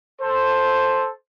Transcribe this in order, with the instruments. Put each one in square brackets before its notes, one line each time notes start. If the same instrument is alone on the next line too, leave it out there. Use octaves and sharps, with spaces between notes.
[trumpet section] A4 C5